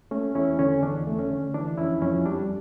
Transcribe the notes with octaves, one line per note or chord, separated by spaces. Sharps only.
A3 C#4
E2 C#4 E4
D3 C#4
E2 D4
A3
C#4
D3
E3 D4
F2 C#4 E4
F2 C#4 E4
G3 D4